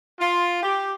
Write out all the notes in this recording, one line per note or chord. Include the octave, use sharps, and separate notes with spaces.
F4
G4